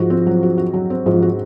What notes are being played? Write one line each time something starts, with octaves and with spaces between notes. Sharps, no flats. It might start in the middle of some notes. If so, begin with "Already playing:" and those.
Already playing: G#2 F3 F#4
C4
F#3
F#4
F#4
F#3
C4
G#2 F3
F#4